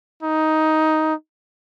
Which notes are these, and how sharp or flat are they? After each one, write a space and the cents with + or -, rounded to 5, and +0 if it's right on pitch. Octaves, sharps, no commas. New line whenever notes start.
D#4 +10